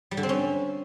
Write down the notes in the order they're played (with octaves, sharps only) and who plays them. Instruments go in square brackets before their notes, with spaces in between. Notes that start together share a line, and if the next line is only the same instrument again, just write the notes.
[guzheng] G3
D3
C4
C#4